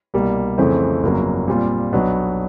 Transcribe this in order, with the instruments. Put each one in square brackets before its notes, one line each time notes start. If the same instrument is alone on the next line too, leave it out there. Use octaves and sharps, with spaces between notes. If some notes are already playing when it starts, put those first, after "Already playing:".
[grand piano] C2 B2 G3 A#3
F2 C#3 E3 A3 C4
G1 F2 C#3 F#3 A#3
A#2 G3 C4 F4
B1 B2 F#3 B3 D4